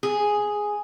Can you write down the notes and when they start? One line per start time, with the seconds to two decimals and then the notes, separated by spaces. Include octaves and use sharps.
0.03 G#4